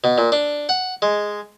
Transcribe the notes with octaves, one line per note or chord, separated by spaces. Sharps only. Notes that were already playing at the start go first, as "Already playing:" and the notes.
B2
A#2
D4
F#5
G#3